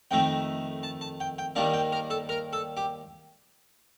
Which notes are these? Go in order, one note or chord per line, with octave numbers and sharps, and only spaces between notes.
F2 D#3 A3 D#4 G5
A5
A5
G5
G5
D#2 D#3 G3 A#3 D4 A5
G5
A#4
A4
A#4
A4
G4